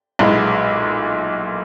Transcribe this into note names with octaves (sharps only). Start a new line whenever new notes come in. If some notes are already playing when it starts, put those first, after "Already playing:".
B1 A#2 G#3 B3 E4